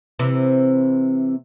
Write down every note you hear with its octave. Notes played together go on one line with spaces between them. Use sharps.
C3 E3